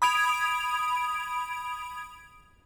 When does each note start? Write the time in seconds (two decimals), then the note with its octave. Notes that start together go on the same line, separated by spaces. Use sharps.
0.02 B5 D#6 G#6 D7 F7